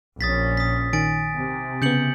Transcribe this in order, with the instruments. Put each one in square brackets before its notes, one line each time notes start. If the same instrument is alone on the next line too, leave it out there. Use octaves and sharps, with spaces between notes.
[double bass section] A#1 C#4 [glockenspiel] D#6 A6 B6
[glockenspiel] D#6 B6
[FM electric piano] D#3 [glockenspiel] G#5 A6 D7
[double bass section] C3
[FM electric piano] C#3 B3 [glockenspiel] G6 C#7 F#7